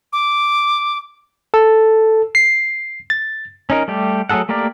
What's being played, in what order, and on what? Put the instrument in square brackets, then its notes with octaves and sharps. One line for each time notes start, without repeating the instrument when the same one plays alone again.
[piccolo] D6
[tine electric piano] A4
C7
A6
[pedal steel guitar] C#4 D#4 A#4
G3 A3 G4
F#3 A3 G#4 A4 F#5
A3 A#3 G4 A#4 D5